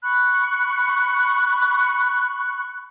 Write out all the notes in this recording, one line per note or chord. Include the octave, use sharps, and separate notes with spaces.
B5 C#6 F#6